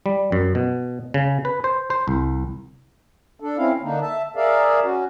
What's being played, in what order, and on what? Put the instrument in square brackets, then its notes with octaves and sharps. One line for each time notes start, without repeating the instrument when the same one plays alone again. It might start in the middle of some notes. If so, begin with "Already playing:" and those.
[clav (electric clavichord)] G3
F#2
B2
C#3
B4
C5
C5
C2
[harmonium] D4 A4
C4 C#4 E4 F5
D3 A#3 D4 D#4
E5 A5
G#4 A#4 D5 E5 F5
C#4 F#4